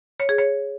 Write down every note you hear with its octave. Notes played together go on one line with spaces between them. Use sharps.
C#5
G#4
C#5